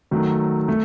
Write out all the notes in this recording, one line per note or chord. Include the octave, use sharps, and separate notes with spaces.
D#3 F#3 A3
A3